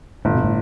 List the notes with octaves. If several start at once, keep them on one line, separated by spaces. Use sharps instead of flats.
G1 A2
B2
A2